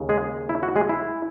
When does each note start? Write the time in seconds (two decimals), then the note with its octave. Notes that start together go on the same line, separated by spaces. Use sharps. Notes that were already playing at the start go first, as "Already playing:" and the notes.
Already playing: D#2 C#3
0.09 G#3 G#4
0.49 E4
0.63 F#4
0.76 G#3 G#4
0.89 E4